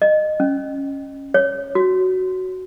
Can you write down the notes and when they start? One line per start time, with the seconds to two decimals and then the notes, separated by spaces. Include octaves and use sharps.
0.02 D#5
0.40 C#4
1.34 C#5
1.75 F#4